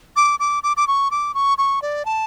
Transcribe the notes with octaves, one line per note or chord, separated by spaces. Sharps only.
D6
D6
D6
D6
C#6
D6
C#6
C#6
D5
A5